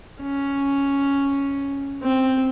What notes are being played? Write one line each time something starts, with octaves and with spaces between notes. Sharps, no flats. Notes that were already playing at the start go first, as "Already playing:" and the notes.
C#4
C4